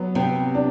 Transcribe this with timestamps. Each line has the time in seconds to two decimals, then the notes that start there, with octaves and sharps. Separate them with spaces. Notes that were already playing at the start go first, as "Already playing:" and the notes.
Already playing: F#3 B3
0.15 C3 B3
0.55 D4